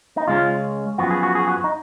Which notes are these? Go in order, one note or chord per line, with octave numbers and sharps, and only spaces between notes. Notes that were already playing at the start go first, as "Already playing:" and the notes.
D#4
C#2 C#3 G#3 C#4 F4
F#2 F3 B3 F#4
G#4
F#4
G#4
F#4
D#4